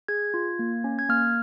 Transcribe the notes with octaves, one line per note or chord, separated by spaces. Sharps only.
G#4 G#6
F4
A#3
C#4
G#6
A#3 F6